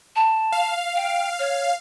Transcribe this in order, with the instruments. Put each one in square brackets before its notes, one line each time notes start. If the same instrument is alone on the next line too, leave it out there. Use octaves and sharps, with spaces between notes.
[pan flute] A5
[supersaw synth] F5
[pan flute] G5
C#5